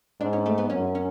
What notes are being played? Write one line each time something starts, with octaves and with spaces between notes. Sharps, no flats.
G#2 D4
C#4
A3
B3
F#2 C#4
C#4